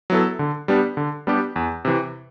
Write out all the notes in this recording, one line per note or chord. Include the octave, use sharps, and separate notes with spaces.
F#3 B3 E4 A4
D3
G3 B3 D4 G4
D3
G3 B3 D4 G4
E2
C3 E3